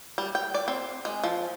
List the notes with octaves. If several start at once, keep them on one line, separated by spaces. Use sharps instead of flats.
G3
G5
D5
C4
G#3
F3